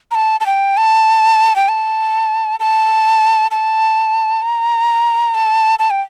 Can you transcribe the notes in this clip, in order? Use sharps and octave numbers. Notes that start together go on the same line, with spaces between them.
A#5
A5
A5
G5
A5
G5
A5
A5
A5
A#5
A5
A5
G5